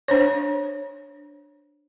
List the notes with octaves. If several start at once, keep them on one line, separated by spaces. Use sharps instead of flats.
D4 C5 C#5